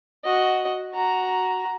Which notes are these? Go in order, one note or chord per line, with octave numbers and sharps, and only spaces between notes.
F#4 D#5
F#4 A#5